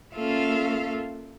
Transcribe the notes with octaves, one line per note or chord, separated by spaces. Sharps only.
A#3 C#4 F4 A4 E5 F5